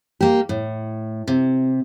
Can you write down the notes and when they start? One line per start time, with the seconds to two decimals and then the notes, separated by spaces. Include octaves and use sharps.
0.21 A#3 G4
0.49 A2
1.28 C3